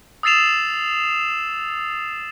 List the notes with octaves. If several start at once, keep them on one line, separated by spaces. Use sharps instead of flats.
D#6 E6 A6 C7 E7 F7